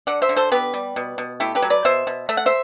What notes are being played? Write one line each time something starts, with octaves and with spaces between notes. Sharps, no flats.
D3 D5 F#5
C5 E5
D3
A4 C5
B3 G4 B4
G3
B2
B2
A3 E4 G4
G4 B4
F#3
B4 D5
B2 C5 E5
B2
A3 E5
F#5
C5 E5